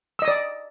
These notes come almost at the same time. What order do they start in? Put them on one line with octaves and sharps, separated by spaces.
E6 D#5 D#6 D5